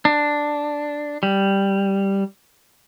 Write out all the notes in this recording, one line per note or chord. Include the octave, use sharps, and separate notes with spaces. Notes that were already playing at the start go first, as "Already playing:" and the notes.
D4
G3